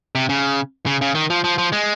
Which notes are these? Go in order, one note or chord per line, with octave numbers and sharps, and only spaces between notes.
C3
C#3
C#3
C#3
D#3
F3
F3
F3
G#3